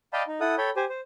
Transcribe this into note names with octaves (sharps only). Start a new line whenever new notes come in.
D5 D#5 F5 G5 A5 B5
D#4
E4 A4 F#5 D#6
A4 C#5 G5 B5
G4 C5 G#5
C5